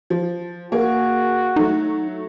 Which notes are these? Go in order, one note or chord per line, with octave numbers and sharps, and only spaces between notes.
F3
A#3 F#4 G#4
F#3 A3 D#4